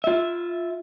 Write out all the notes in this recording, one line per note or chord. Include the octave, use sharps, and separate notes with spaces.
F4 E5